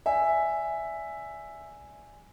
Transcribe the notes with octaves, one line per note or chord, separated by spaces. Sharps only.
D5 E5 G#5